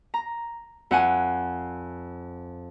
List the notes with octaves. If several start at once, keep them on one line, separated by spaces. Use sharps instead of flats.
A#5
F2 F#5 G#5